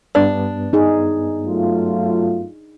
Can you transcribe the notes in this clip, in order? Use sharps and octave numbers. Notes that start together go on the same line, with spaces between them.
G2 B3 D4
D#4 G#4
F#3 A3 F4